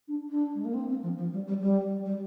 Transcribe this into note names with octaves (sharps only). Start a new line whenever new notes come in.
D4
D4
G#3
A#3
C4
C4
F3
F3
G3
G3
G3
G3